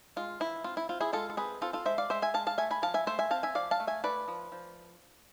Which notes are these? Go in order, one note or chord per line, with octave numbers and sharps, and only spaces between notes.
G#3 F4
E3 E4
C4 F4
E4
C4 F4
E4 G#4
G#3 F4 A4
A4
C4 G#4 B4
C4 F4 A4
F4 A4
G#3 C5 E5
D5 F5
G#3 C5 E5
E5 G#5
G#3 F5 A5
F5 A5
A3 E5 G#5
G#5 B5
F3 F5 A5
E5 G#5
A3 C5 E5
E5 G#5
C4 F5 A5
E5 G#5
F3 D5 F5
F5 A5
A3
E5 G#5
A3 B4 D5
F3
F3